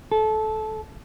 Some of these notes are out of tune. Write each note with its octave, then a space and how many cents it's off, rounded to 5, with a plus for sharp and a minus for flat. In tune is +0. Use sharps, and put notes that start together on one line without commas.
A4 -20